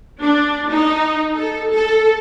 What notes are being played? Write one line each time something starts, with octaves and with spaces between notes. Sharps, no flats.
D4
D#4
A4
A4